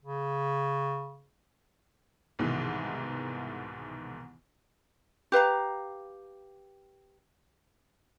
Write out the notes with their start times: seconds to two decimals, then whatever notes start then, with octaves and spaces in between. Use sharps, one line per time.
0.03 C#3
2.39 C2 G#2 B2 D#3 E3
5.32 G4 B4 F5 A#5